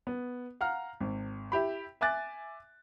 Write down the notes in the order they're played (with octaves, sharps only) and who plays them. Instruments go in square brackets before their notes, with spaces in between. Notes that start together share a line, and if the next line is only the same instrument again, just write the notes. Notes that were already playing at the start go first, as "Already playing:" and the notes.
[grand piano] B3
F5 F#5 A#5 F6
G#1
E4 G4 B5
E5 G#5 D6 F#6 A6